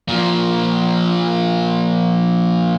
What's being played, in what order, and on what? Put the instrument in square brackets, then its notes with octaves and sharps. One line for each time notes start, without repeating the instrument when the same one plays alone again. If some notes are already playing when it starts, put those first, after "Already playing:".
[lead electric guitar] A#2 F3